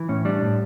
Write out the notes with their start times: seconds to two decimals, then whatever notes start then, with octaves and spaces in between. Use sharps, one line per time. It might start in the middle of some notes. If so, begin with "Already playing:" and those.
Already playing: E3
0.09 A2 C#4
0.25 G3 D4
0.42 A2